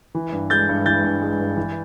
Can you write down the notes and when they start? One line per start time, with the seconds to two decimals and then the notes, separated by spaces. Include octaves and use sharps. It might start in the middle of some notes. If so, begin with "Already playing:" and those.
0.15 E3
0.32 G2
0.50 G#3 G6 A6
0.69 G2
0.86 E3 G6 A6
1.04 G2
1.22 G#3
1.39 G2
1.57 E3